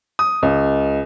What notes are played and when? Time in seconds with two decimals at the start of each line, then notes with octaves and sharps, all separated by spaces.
0.19 D#6
0.43 C#2